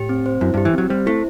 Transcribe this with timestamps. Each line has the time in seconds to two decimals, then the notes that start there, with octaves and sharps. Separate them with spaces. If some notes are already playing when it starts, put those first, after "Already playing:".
Already playing: A2 G4
0.09 C4
0.26 C5
0.41 F#2 E4
0.54 G2 G4
0.65 E3
0.74 F#3 C4
0.90 G3 C5
1.06 A3 E4